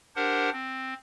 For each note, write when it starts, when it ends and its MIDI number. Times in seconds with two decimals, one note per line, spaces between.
0.16 0.50 62
0.16 0.50 67
0.16 0.50 70
0.16 0.50 72
0.16 0.50 78
0.53 0.94 60